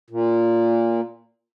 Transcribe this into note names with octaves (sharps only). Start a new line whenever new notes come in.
A#2